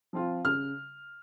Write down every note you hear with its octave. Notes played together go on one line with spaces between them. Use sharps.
F3 C4 F4
C#3 F6